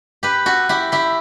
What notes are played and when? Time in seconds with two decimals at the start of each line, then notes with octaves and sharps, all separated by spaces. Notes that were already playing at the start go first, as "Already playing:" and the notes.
0.23 G4 B4
0.46 F#4 A4
0.69 E4 G4
0.92 E4 G4